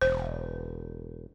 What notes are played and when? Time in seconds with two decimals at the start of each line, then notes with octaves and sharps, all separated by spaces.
0.02 E1 C5